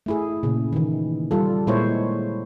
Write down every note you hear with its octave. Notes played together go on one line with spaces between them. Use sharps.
A3 E4 G#4
A#2 C#3
D#3 E3
G3 F4 A4
A#2 G#3 A#3 E4 C5 C#5